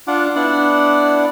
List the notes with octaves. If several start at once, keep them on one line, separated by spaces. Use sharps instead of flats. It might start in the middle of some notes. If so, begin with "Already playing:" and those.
D4 F4 F#5 D6
B3 D4 E4 D5 F#5